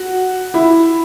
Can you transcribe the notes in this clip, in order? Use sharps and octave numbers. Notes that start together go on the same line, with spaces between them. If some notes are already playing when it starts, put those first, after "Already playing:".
Already playing: F#4
E4